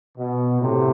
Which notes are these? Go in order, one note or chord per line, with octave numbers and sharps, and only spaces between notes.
B2
A2 C3